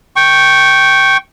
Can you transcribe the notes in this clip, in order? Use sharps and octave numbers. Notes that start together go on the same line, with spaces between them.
G5 C#6